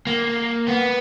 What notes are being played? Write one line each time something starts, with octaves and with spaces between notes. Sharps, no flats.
A#3
B3